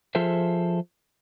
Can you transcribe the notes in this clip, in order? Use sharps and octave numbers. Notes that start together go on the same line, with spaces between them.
F3 F4 G#4 A4 C5 E5